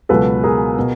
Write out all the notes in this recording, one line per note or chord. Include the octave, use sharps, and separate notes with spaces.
C#2 B2 F#3 A4 B4
G#4 A#4
B2